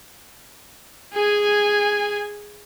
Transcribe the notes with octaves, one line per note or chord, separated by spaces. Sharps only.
G#4 G#5